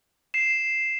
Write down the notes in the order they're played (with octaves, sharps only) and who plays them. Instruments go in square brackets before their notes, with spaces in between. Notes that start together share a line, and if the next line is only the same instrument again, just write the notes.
[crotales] C7 E7